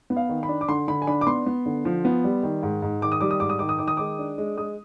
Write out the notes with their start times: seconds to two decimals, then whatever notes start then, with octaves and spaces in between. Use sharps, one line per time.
0.10 B3
0.17 F5
0.29 D#3
0.43 B5
0.49 D4
0.61 D6
0.68 D3 C6
0.88 D3 B5
1.02 G#5
1.07 D4 B5
1.21 D6
1.27 B3 C6
1.46 B3
1.66 D3
1.85 F3
2.05 B3
2.24 G3
2.43 D#3
2.63 G#2
2.82 G#2
3.02 D#3 D6
3.12 D#6
3.21 G3 D6
3.31 D#6
3.40 G#2 D6
3.49 D#6
3.59 D#3 D6
3.69 D#6
3.79 D#3 D6
3.88 D#6
3.97 G#3 D6
4.19 D4
4.38 G#3
4.57 G#3 D#6